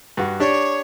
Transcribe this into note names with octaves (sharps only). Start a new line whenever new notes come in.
G2 F#4
D4 G4 C#5